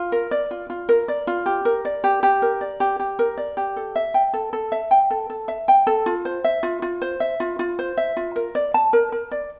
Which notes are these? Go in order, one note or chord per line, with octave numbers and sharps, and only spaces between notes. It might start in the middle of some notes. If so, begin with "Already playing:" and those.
Already playing: F4
A#4
D5
F4
F4
A#4
D5
F4
G4
A#4
D5
G4
G4
A#4
D5
G4
G4
A#4
D5
G4
A4
E5
G5
A4
A4
E5
G5
A4
A4
E5
G5
A4
F4
C5
E5
F4
F4
C5
E5
F4
F4
C5
E5
F4
A#4
D5
A5
A#4
A#4
D5